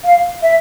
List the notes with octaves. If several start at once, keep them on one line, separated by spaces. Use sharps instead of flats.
F5
E5